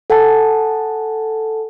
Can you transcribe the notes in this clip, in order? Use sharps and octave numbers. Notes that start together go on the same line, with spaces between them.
A4 F#5 G#5 A5